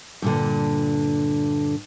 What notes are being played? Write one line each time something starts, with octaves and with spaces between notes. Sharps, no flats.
G2 A#2 D3